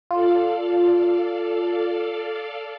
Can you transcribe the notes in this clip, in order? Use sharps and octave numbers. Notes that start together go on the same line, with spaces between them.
F4 A4 D5 F5